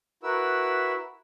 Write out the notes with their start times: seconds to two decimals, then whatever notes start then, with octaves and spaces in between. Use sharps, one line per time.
0.23 E4 F#4 A#4 B4 E5 E6